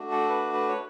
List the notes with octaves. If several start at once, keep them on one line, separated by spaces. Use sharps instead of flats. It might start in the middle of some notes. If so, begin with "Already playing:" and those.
Already playing: A3 D4 F#4
A4
B4
B4
C#5